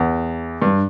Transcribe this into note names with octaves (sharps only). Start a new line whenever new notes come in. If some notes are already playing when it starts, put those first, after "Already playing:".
Already playing: E2
G2